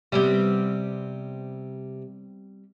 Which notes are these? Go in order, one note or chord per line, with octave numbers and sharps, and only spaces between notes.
C3 G3 B3 C4